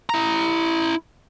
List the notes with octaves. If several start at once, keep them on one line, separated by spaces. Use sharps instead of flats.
E4 A#5